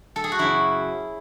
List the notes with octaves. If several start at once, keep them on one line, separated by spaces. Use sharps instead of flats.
A4
G#4
F#4
F#2 C#3 F#3 E4